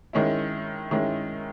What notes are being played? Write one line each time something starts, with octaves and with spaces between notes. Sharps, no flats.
D#3 G#3 C#4 E4
D#3 G#3 C#4 E4